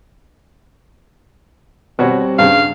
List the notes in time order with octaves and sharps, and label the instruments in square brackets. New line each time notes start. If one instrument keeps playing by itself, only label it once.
[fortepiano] B2 F#4 C#5 [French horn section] G3 C4
[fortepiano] G2 C#3 [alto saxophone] F5